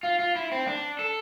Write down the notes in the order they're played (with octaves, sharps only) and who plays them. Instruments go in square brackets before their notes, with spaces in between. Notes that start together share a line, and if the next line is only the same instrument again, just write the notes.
[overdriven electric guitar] F4
F4
E4
C4
D4
A4